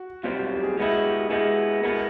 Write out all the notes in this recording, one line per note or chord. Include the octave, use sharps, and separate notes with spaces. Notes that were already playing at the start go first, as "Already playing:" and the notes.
Already playing: F#4
B1 B2 G3 C4 F4
F#4
G4
G#4
B2 G#3 B3 E4 G#4
F#4
G4
G#4
B2 G#3 B3 E4 G#4
B2 G#3 B3 E4 A#4